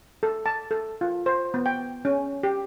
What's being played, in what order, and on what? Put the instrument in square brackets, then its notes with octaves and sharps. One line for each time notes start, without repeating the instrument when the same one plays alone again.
[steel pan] A4
A5
A4
F4
C5
B3
G5
C#4
G4